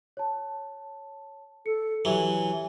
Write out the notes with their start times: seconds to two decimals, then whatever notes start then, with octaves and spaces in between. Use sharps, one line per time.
0.17 C#5 A5
1.66 A4 C#7
2.05 E3 F#3 G4 G#5